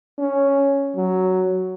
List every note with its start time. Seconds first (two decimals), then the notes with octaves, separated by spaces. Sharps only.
0.18 C#4
0.96 F#3